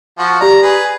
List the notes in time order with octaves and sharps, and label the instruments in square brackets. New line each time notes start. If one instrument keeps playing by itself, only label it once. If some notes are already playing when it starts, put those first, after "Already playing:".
[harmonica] F3 F#4
[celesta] G4 D5 [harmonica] A#5
[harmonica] G#4 B4
[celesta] G#5